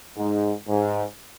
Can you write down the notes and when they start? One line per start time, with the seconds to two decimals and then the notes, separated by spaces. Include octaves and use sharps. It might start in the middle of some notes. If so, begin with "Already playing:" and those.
0.17 G#2
0.67 G#2